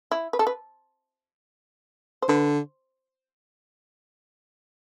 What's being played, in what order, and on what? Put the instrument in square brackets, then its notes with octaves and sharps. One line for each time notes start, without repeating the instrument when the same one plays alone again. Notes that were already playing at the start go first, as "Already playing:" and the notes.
[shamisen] E4
B4
A4
B4
C5
[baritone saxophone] D3 [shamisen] B4